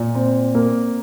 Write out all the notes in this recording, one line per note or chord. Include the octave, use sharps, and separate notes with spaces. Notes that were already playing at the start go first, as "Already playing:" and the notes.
Already playing: A#2
C4
A#3